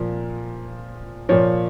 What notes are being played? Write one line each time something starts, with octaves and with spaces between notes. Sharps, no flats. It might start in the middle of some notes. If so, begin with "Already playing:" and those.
Already playing: A#2 F3
A#2 F3 C#5